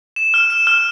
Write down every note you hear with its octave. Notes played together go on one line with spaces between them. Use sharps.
E7
F6
E7
F6